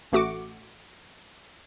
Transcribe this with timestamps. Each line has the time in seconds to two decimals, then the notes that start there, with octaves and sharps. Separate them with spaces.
0.12 A1 A3 F#4 D6 C#7